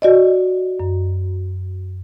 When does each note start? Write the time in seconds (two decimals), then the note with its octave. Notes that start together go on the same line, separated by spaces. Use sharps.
0.02 F#4 D5 D#5
0.80 F#2